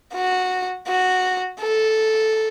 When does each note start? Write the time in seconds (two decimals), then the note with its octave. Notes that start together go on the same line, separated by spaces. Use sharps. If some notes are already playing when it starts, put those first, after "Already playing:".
0.14 F#4
0.88 F#4
1.61 A4